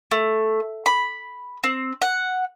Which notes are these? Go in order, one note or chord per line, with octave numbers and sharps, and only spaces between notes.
A3
B5
C4
F#5